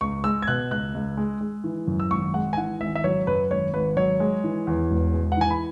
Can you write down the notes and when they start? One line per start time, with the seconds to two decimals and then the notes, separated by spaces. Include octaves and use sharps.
0.01 C#2 C#6
0.24 G#3 E6
0.42 G#6
0.47 B2 F#6
0.71 C#2 F#6
0.94 C#2
1.17 G#3
1.41 G#3
1.64 E3
1.87 F#2
2.00 E6
2.11 G#1 C#6
2.34 G#3 F#5
2.53 G#5
2.57 E3 F#5
2.80 G#1 E5
2.95 E5
3.04 F#3 C#5
3.27 F#2 B4
3.51 G#1 C#5
3.74 G#1 B4
3.97 F#3 C#5
4.20 G#3
4.44 E3
4.67 E2
4.91 E1
5.14 G#3
5.32 F#5
5.37 E3 G#5
5.50 B5